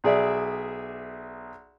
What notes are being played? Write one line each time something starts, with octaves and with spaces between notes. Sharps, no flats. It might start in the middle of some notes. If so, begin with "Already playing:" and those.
B1 G#4 D5 E5